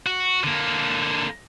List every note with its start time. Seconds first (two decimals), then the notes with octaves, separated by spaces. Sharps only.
0.06 F#4
0.44 D3 A#3